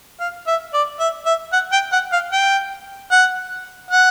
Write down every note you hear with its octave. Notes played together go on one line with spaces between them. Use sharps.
F5
E5
D5
E5
E5
F#5
G5
F#5
F5
G5
F#5
F#5